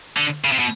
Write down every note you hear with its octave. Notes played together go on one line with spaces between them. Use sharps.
D3
C#3
C3
B2